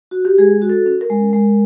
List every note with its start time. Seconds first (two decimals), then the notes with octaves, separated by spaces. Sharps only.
0.11 F#4
0.25 G4
0.38 G#3 G#4
0.62 F#4
0.70 A4
0.86 C#4
1.01 A#4
1.10 G#3
1.33 G#3